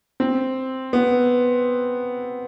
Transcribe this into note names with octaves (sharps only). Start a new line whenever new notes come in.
C4
B3